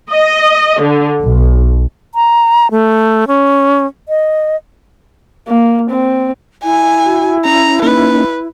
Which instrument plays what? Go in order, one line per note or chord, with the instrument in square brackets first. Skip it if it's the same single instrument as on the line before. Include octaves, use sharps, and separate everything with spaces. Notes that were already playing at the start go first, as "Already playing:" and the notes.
[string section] D#5
D3
B1
[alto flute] A#5
A3
C#4
D#5
[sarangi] A#3
C4
[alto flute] E4 [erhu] G#5
[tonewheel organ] F#4
[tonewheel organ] C#4 [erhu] A#5
[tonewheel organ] A#3 C#4 D#4 [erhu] B4